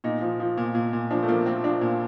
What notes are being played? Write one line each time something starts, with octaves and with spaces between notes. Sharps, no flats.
A#2 D#4
F3
F3
A#2
A#2
A#2
F3 D4
A3
F3 A#3
F3 C4
F3 D4
A#2